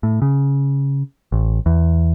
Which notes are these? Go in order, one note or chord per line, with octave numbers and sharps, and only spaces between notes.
A2
C#3
A1
E2